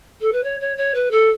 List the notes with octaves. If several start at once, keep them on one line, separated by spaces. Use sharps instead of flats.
A4
B4
C#5
C#5
C#5
B4
A4